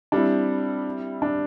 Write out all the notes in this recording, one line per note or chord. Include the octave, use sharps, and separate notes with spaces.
G3 C4 D4 E4
D4